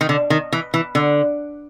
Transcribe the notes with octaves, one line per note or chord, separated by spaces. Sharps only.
D#3
D3
D#3
E3
E3
D3